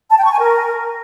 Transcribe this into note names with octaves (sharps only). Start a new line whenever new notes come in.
A5
G5
C#6
G#5
A#4